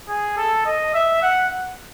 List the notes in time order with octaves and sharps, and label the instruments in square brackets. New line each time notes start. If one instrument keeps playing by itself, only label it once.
[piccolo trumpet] G#4
A4
D#5
E5
F#5